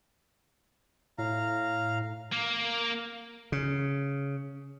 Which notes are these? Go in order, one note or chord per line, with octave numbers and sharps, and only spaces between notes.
A2 F5 A#5
A#3
C#3